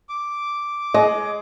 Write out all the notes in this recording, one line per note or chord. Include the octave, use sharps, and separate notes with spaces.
D6
G#3 D#5